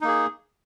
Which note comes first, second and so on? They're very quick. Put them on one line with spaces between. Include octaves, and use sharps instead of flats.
D#4 A#3 G#4